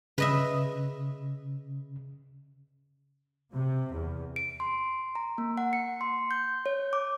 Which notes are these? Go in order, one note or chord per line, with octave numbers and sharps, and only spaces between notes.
C#3 B4 D#5 E5
C3
E2
D7
C6
A#5
A#3
F#5
C#7
C6
G6
C#5
D6